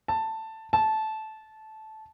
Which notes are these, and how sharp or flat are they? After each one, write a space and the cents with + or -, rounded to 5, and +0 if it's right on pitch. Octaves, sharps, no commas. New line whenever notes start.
A5 +10
A5 -15